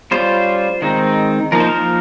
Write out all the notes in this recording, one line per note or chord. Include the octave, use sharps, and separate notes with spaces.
G3 C#4 F4 C5
D#3 G#3 C4 D#4
F3 A#3 D#4 A#4
C5
A#4